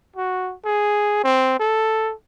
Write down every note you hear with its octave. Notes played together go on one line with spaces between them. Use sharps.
F#4
G#4
C4
A4